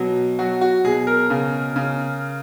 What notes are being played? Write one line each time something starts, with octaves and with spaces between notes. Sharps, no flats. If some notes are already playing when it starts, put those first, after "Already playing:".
Already playing: B2 F#3
F#3 F#4
F#4
B2 G#4
A#4
C#3
C#3